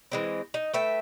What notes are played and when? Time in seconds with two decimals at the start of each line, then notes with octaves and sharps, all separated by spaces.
0.12 E3 G#3 C4
0.54 D#4
0.74 A3 B4 E5 G5